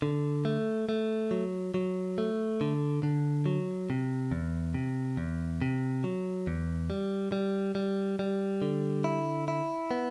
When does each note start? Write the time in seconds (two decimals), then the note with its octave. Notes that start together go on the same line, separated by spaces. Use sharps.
0.02 D3
0.45 A3
0.89 A3
1.31 F#3
1.74 F#3
2.18 A3
2.61 D3
3.03 D3
3.46 F#3
3.90 C3
4.31 E2
4.74 C3
5.17 E2
5.62 C3
6.04 F#3
6.47 E2
6.90 G3
7.32 G3
7.75 G3
8.19 G3
8.62 D3
9.04 E4
9.48 E4
9.91 B3